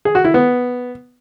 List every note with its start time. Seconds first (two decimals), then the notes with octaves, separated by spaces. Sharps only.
0.05 G#4
0.15 F#4
0.25 E4
0.34 B3